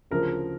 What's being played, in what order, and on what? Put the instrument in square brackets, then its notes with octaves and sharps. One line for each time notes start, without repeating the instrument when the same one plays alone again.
[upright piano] D2 C#3 F3 A#4